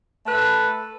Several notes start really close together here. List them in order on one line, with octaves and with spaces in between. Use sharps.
A3 B4 A4